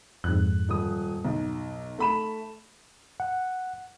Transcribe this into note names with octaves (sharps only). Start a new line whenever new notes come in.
F2 G#2 F#6
D#1 D#6
B1
A3 B5 E7
F#5